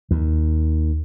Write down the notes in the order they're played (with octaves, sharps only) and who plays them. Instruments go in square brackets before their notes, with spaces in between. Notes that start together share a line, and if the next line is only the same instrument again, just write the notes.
[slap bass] D#2